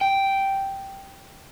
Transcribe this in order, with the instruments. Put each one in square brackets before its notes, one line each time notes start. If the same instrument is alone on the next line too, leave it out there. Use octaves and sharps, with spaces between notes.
[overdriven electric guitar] G5